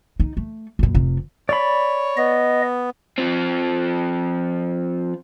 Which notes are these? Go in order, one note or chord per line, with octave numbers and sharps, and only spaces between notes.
D#4
A3
F#2 A#2
F1 C3
C#5 D5 B5
B3 D#5
F3 C4